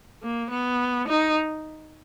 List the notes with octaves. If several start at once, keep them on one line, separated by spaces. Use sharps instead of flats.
A#3
B3
D#4